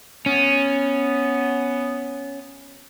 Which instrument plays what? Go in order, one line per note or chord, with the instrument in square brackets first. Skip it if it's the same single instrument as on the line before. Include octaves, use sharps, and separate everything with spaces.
[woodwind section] B3 [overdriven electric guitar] C#4